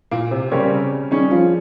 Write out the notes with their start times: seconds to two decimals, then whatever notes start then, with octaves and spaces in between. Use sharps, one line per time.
0.11 A#2 A#3
0.31 C3 C4
0.51 C#3 G3 C4 C#4 G4 A#4 C#5
1.11 D#3 G3 C#4 D#4 G#4
1.31 F3 F4